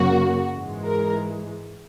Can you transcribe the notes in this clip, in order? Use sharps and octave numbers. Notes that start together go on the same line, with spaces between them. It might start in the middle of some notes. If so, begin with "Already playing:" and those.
Already playing: F#2 C#3 F#3 A#3 F#4
G#2 E3 G#3
A#4